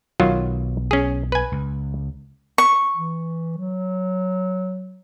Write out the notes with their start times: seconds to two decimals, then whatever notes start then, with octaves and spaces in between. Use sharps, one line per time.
0.20 B1 D#3 F#3 F4
0.91 C#4 G#4
1.32 B4 G#5
1.52 C#2
2.58 C#6
2.96 E3
3.57 F#3